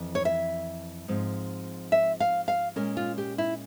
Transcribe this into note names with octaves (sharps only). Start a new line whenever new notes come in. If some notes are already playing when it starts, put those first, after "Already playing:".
Already playing: F2 E3
C#5
E5
G#2 F3 C4
E5
F5
F5
A#2 G#3 C#4 A#4
F4
G4
E4